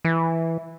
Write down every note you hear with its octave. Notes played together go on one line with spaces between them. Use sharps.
E3